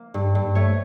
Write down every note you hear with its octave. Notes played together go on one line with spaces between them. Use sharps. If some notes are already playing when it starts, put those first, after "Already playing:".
Already playing: A#3
G2
G2
A3 C#5